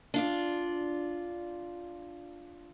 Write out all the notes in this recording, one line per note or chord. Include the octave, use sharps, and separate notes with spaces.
D4 F4 D5